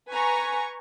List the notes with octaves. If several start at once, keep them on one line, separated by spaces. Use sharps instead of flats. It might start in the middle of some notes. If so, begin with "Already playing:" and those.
B4 G#5 A#5 C#6